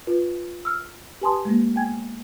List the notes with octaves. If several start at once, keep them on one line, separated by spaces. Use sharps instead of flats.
F4 B4
E6 F6
G4 B4 G#5 A5 C6 D#6
G#3 A#3
B3 G5 G#5 G#6